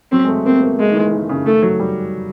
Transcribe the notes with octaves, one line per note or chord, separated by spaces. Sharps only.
F#3 C4
G#3
A3
A#3 C4
B3
A#3
G#3 A#3
D#3
E3
D#3
C#3
D#3 A3
F#3
G3